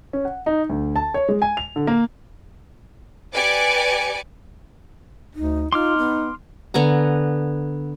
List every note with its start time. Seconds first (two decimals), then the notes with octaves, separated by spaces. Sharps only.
0.13 C#4
0.25 F#5
0.46 D#4
0.69 D2
0.96 A5
1.14 C#5
1.29 G#3
1.42 G#5
1.57 F7
1.76 D3
1.87 A#3
3.33 G4 B4 D5 G#5 D6 C#7
5.35 D2 D#4
5.72 D#4 F4 C6 D6 F6
5.98 B3
6.74 D3 B3 G#5 A#5